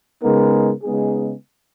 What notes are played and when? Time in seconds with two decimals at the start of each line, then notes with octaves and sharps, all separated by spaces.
0.23 C#3 G#3 B3 D#4 A#4
0.83 C#3 G#3 B3 D#4 G#4